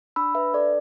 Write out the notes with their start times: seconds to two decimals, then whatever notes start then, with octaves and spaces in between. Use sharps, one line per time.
0.16 D4 B5 E6
0.35 B4 E5
0.54 A4 D5